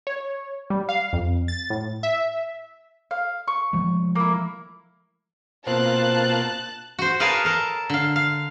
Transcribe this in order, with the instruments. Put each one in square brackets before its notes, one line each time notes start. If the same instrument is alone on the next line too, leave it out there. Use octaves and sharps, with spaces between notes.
[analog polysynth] C#5
G3
F5
F2
A6
A2
E5
[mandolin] F5
C#6
[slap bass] F3 G#3 A3
[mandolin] A#3 E4
[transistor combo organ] B2 A#3 F4 [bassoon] C4 [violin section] A5 F#6
[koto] F#4 C5
G#4 A#4 B4 C#5 F5 A5
A4 A#4 A5
D3 F5
F5